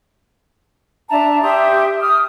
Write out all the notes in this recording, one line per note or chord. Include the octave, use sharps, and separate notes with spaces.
D4 E5 A5 A#5
G4 E5 C6 D#6
D#6 F6